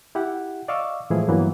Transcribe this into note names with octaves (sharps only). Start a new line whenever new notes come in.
E4 G4 F#5
D5 D#5 F5 C#6 D6 E6
A2 E3 F3 G#3 E4 G#4
G2 E3 F#3 A#3 B3